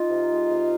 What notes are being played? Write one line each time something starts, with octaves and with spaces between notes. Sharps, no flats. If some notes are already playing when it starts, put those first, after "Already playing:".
Already playing: D#4 F4
C3
G#3
C3